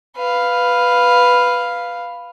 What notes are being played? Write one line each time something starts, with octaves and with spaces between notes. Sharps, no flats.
B4 F5